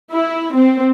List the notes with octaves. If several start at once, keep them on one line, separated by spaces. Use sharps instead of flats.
E4
C4